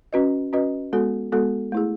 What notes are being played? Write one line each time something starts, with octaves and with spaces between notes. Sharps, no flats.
C#4 F#4 B4 D#5
C#4 F#4 B4 D#5
G#3 B3 F#4 A4
G#3 B3 F#4 A4
A3 E4 G#4